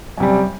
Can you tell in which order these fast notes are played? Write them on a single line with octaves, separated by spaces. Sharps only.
F#2 C3 G3